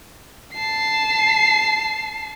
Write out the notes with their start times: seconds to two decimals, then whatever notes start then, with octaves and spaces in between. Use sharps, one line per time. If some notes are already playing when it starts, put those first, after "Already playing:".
0.54 A5 C7